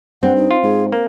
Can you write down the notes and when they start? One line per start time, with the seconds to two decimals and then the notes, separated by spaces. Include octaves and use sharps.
0.23 G2 C4 F#5
0.36 D#4
0.51 F4
0.63 G#2 G#4
0.92 A#3 A#4